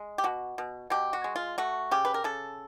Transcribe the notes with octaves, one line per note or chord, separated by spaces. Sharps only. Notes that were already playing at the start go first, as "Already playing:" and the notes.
Already playing: G#3
G4
B2 F#4
B2
B2 G4
F#4
G#3
F4
A3 F#4
C#3 G4
B4
A#4
C#3 A4